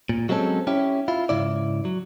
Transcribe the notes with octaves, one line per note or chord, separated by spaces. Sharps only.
A#2
F#3 G#3 C4 C#4 A4
C#4 E4 G4
E4 F4
G#2 C#3 E4 D5
F#3